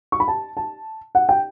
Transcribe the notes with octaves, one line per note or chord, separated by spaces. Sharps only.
C#6
B5
A5
A5
F#5
G5